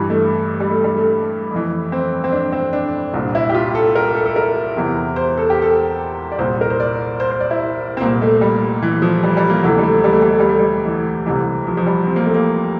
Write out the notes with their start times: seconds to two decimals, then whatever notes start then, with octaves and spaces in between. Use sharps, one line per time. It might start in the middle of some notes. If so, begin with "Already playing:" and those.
Already playing: G2 E3 G3
0.10 A3
0.60 G3
0.70 A3
0.84 G3
0.97 A3
1.51 F2 E3
1.92 C4
2.24 C4
2.32 D4
2.52 C4
2.73 D4
3.14 C2 A#2 D4
3.35 E4
3.49 G4
3.54 F4
3.75 A4
3.95 A#4
4.15 A4
4.26 A4
4.36 A#4
4.77 E2 C3 E3
5.16 C5
5.38 A4
5.50 G4
5.62 A4
6.32 D5
6.39 C2 A#2 C5
6.61 A#4
6.70 C5
6.80 D5
7.20 C5
7.30 C5
7.40 D5
7.51 E4
7.97 C4
8.01 C2 A#2 A#3
8.22 A3
8.41 G3
8.82 E3
9.02 F3
9.23 G3
9.37 G3
9.49 A#3
9.63 D2 C3 E3 A3
9.78 G3
9.83 A3
10.04 G3
10.13 A3
10.22 G3
10.31 A3
10.40 G3
10.49 A3
10.59 G3
10.85 E3
11.26 C2 C3 E3
11.67 F3
11.77 F3
11.87 G3
12.07 C4
12.16 A#3
12.25 A3
12.34 A#3